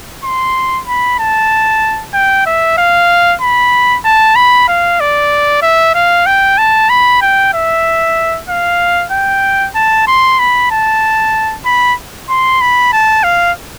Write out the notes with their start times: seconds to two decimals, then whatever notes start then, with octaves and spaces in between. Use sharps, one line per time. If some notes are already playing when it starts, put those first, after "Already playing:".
0.24 C6
0.87 B5
1.20 A5
2.14 G5
2.46 E5
2.78 F5
3.42 B5
4.05 A5
4.36 B5
4.68 F5
5.00 D5
5.62 E5
5.95 F5
6.27 G5
6.58 A5
6.90 B5
7.22 G5
7.54 E5
8.49 F5
9.12 G5
9.75 A5
10.07 C6
10.39 B5
10.71 A5
11.65 B5
12.30 C6
12.61 B5
12.93 A5
13.24 F5